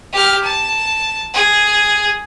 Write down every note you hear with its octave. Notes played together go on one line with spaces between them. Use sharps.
G4 F6
A5
G#4